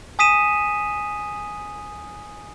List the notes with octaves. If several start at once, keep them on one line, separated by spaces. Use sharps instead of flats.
G#5 D#6 B6 D#7 E7